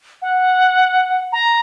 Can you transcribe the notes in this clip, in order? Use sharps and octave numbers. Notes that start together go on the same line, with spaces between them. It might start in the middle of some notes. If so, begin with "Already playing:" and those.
F#5
A#5